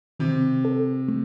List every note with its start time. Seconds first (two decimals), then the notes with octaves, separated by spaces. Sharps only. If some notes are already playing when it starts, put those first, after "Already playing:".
0.19 C3 D#3
0.65 A4
1.08 A3